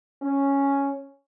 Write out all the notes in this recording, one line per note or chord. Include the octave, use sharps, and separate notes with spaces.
C#4